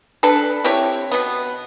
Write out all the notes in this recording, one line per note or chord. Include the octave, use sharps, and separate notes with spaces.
D4 A4 B4
C4 E4 G4 C#5
B2 B3